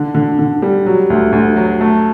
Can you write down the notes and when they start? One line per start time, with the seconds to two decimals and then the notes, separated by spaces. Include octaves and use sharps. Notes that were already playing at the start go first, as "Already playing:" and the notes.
Already playing: D3
0.15 D3
0.39 D3
0.62 G3
0.86 F#3
1.10 D2
1.32 D2
1.56 F#3
1.81 A3